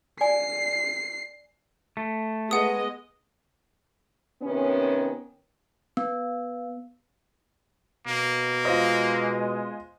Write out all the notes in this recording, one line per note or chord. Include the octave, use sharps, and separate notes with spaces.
D5 G#5 C7
A3
G#3 B3 D#5 F#5 D#6
C3 D#3 B3 C#4
B3
B2 A#3
G#3 F4 C5 D#5